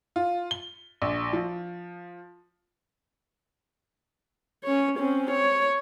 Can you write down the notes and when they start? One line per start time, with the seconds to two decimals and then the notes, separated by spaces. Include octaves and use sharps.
0.16 F4
0.51 G7
1.02 A#1
1.33 F3
4.64 C#4 C#5
4.99 C4 C#4
5.31 C#5